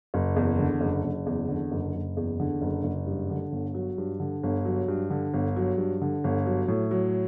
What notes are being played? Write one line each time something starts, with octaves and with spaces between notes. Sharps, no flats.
F#1
E2
D3
F#1
F#1
E2
D3
F#1
F#1
E2
D3
F#1
F#1
G2
D3
G1
F#3
G2
D3
G1
F#3
G2
D3
G1
F#3
G2
D3
G1
F#3
A2
F#3